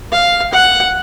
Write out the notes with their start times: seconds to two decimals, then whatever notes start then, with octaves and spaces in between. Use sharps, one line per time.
0.12 F5
0.53 F#5